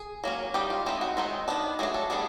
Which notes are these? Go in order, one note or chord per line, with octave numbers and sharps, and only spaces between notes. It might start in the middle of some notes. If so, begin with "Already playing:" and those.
Already playing: G#4
F#3 A#3 C#4
G3 B3 D#4 G4
F4
G#3 C4 D#4 E4
F#4
D#3 G#3 C4 D#4
D#3 F#3 B3 D4
F#3 A3 D4 G#4
A4
G3 B3 D4 G#4